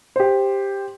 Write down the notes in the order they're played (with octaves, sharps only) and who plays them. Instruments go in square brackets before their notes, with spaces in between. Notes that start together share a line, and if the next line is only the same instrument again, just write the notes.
[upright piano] G4 C5